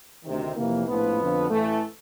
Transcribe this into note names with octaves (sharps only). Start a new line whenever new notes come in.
D2 C3 D#3
F2 C3 E3 A#3
A#1 A2 F3 B3
F2 D3 F3
A1 A2 E3 A3